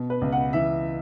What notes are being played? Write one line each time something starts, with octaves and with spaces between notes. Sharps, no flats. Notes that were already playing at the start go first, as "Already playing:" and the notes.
Already playing: B2
B4
C#2
F#5
E3 E5